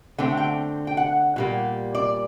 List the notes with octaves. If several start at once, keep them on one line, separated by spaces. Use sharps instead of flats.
D3 A3 C4 G5
F#5
G5
G5
F#5
A#2 G3 A#3 F#5
D5